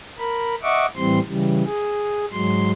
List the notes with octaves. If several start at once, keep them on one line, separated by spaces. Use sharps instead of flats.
A#4 B5
D#5 E5 F#5 C#6 D6
A2 E3 G3 C4 C6
C#3 E3 G3
G#4
G#2 F#3 G#3 C6